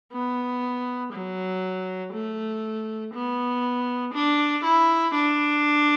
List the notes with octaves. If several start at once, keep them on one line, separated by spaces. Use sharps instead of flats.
B3
F#3
A3
B3
D4
E4
D4